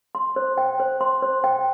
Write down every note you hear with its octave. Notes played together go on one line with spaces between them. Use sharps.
C6
C5
G5
C5
C6
C5
G5